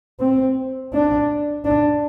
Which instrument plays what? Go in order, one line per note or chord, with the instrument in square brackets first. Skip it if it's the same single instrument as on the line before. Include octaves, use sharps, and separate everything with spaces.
[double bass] C4
D4
D4